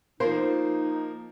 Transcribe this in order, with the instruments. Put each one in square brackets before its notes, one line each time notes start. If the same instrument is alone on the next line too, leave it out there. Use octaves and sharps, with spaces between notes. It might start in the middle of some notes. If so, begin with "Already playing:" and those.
[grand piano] F3 A#3 [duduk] D#4 [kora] C5